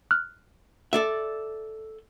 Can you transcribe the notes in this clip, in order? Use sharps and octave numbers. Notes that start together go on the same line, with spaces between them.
F6 F#6
A4 D5 E5